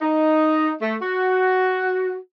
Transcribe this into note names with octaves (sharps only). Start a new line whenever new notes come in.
D#4
A3
F#4